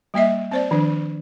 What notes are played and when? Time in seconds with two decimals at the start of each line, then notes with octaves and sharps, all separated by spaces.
0.14 G3 A#3 D#5 E5
0.51 C4 C5 D5
0.71 D#3 F3 D4